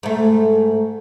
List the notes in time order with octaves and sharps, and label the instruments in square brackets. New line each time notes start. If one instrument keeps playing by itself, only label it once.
[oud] G#2 A3